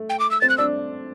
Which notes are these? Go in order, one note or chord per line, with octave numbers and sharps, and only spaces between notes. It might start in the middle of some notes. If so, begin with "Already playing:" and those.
Already playing: A3
G5
D6
E6
C4 A6
F#6
D4 E6